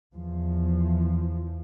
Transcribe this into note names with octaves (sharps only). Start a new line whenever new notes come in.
E2 F3